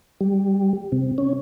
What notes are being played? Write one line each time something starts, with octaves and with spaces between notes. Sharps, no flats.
G3
C3
C#4